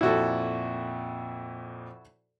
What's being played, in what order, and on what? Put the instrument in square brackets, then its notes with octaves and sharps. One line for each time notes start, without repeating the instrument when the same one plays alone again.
[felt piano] F2 A#2 [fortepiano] E4 F#4 A4